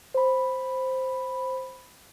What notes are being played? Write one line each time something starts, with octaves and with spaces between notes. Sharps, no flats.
C5 B5